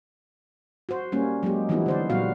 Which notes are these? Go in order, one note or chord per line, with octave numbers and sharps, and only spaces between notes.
F#4 C5
G3 A#3 C#4
F#3 G#3 A#3 G4
E3 F3 G3 B3 D#4 E4
D3 C5 D5
A#2 F#3 G3 B3 F#4 F5